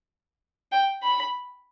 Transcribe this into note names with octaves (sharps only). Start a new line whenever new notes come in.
G5
B5